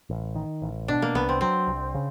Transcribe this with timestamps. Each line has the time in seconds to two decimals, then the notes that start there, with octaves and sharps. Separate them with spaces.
0.10 A1
0.35 D#3
0.62 A1
0.88 B2 D4
1.02 A#3
1.15 C2 B3
1.29 C4
1.41 F#3 C4
1.67 C2
1.94 C#3